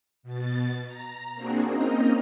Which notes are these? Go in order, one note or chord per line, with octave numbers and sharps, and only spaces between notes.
B2 A6
A#5
A#3 C4 D4 F#4 G#4
A#3 C4 C#4 D#4 D#5 A#5